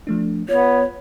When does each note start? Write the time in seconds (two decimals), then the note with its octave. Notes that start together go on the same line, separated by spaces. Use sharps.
0.07 F3 A3 D4
0.49 B3 F4 C#5